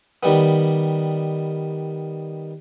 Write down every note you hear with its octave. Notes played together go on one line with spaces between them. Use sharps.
D#3 G3 B3